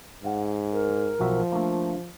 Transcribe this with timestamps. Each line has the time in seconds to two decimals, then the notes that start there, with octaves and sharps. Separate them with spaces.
0.24 G#2 F5 F#5
0.73 A#4
1.20 B1 F3 F#4 E5
1.52 A3 A#3 D4